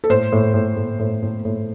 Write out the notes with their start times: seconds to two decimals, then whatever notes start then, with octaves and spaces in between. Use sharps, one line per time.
0.04 A4
0.10 A2 C5
0.32 A2
0.54 A2
0.76 A2
0.99 A2
1.22 A2
1.45 A2